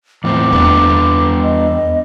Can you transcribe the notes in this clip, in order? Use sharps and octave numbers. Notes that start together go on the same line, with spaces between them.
E2 A2 C4 D6
E2 B3 D4 B4
D#5